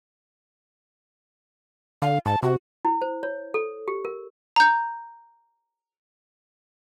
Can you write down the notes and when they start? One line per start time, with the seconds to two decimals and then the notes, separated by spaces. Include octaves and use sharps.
2.02 D3 F5
2.26 G#2 A5
2.43 C3 F#4
2.85 E4
3.02 C5
3.23 C#5
3.54 A4
3.88 G4
4.05 A#4
4.56 A#5 G6